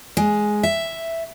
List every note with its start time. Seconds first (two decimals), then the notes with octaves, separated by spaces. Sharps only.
0.17 G#3
0.63 E5